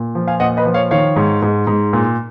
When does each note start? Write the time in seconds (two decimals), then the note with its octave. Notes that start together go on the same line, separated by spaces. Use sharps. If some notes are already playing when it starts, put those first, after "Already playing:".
Already playing: A#2
0.15 F3
0.27 F5 G#5
0.40 A#2 D#5 F#5
0.57 B4 D#5
0.65 F3
0.74 C#5 F5
0.91 D#3 C#5 F5
1.16 G#2
1.42 G#2
1.67 G#2
1.93 A#2